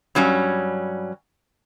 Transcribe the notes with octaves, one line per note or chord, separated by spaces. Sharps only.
G2 F#3 G3 C#4